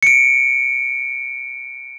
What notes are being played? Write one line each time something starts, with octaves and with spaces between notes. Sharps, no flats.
C#7 D7